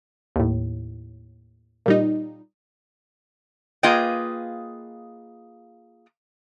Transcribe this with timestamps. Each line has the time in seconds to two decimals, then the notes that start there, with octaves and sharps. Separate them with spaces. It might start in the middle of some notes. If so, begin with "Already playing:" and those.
0.36 D#2 A2
1.86 A#2 G3 D#4
3.83 A#3 F4 G#4 B4 D#5 G5